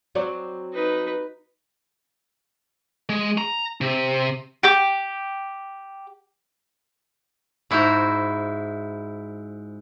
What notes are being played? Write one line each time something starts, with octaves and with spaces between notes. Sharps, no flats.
F#3 C4 D5
D#4 B4
G#3
A#5
C3
G4 G5 D6
G#2 E4 F#4 C5 A#5